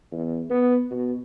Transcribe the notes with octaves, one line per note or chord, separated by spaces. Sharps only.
E2
B3
B2